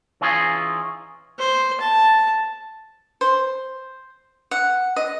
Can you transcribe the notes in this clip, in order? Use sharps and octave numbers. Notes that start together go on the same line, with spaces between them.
E3 C#4 D#4 F4 G#4
C5
A5
C5
F#5
D#5